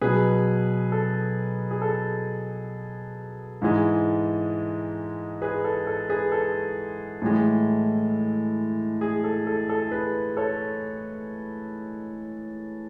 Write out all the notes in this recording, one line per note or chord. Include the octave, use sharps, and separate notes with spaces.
B2 F#3 G#4 B4
A4
G#4
A4
G#2 E3 G#3
G#4 B4
A4
A4
G#4 B4
A4
A2 E3 G#3
G#4
A4
A4
A4
G#4 B4
A4 C#5